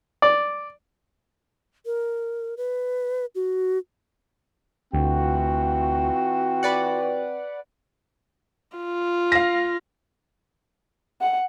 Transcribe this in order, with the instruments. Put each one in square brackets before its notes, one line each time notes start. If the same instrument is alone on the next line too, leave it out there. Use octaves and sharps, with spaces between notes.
[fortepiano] D5
[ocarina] A#4
B4
F#4
[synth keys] D2 [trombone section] E3 F4 F#4 [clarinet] C4
[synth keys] B4 D5 F#5
[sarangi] F4
[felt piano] F5 A#6
[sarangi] F#5